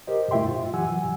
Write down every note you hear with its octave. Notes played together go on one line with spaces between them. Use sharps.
G4 A#4 C5 D#5
A3 E4 F4 E5 G5 C6
F4
E3 F#3 G4 F#5 G#5 E6